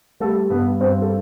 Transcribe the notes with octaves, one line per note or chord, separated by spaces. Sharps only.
G3 A3 A4
G2 B3 B4
G2 C4 C5
A4